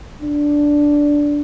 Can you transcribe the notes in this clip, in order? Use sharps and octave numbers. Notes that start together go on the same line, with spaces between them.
D4